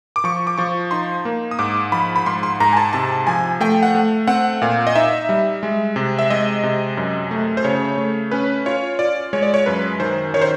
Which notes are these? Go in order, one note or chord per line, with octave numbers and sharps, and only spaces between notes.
D6
F3 C#6
D6
F3 C#6
D#4 C6
A#3
D#6
G#2 D6
F3 B5
B5
G#2 C6
C6
G#2 A#5
G#5
A5
C3 A5
F3 G#5
A3 G5
F#5
A3
C4 F#5
A#2 F5
D#5
D#4 E5
G3
G#3
C3
E5
G#3 D#5
C3
F#2
A3
C5
C#3 C#5
A3
C#4 B4
F4 C#5
F4 D5
G#3 C#5
D5
C#5
F#2 B4
D#3 C5
D#3 C#5
C5